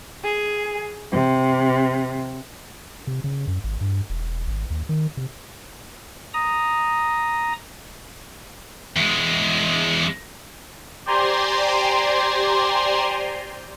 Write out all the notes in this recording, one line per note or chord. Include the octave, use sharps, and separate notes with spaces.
G#4
C3
C3
C#3
F#2
G#1
G2
E1
G#1
D#2
D#3
C3
A#5 D#6
E2 G#3
G4 C5 D5 G#5 A#5 C6